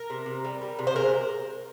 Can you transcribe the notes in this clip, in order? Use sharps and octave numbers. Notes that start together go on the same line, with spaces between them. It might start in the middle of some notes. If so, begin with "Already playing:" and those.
Already playing: A#4
C3
C3
G3
G3
C3
C5
G#3 A#4